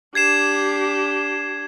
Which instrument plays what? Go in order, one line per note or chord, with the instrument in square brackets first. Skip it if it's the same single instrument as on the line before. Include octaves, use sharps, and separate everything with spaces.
[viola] D4 G4 [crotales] G#6 C7 E7